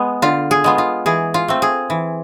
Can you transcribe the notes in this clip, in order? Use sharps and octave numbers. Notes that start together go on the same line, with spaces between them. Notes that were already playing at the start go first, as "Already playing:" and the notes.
Already playing: G#3 B3
D3 F4
G#4
G#3 B3 F4
F4
E3 G#4
F4
A3 C4
G#4
E3